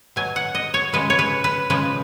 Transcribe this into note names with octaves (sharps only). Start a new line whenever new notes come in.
B2 F#3 G#5
F#5
D#5
C#5
C#3 F3 G#3 B4
C#5
B4
B4
C#3 F3 G#3 B4